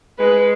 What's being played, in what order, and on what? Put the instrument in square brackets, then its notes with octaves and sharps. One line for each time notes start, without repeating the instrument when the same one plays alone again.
[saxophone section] G#3 [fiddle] B4